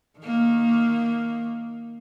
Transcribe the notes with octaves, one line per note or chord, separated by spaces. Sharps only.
D#3 A#3